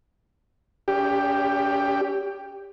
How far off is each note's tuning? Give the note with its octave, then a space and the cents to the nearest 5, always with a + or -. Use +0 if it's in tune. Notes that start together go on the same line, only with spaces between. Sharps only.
C#4 +45 G4 +10